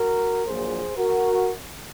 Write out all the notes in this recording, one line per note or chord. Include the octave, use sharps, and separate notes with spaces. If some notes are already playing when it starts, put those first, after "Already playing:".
Already playing: F#4 A#4
A#1 A#2 F#3 G#4 C5
F#4 A#4